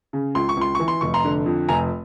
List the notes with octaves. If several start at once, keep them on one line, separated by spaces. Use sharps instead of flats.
C#3
C#2 C6
C#6
C#2 C6
E3 C#6
C6
F1 C#6
A#5 C6
D3
F2
F1 G#5 A#5